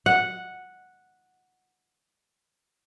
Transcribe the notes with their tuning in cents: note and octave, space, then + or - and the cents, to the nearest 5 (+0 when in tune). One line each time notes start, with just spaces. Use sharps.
F#5 -5